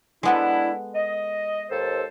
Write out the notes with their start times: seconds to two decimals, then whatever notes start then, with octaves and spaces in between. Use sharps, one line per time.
0.23 G#3 B3 D4 E4 A4
0.94 D#5
1.70 D#2 A4 C5